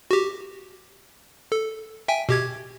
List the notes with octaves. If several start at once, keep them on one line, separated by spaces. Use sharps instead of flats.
F#4 G4
A4
E5 G5 G#5
B2 G4 G#6